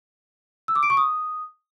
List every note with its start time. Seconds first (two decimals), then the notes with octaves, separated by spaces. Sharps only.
0.68 E6
0.75 D6
0.83 D7
0.90 C#6
0.97 D#6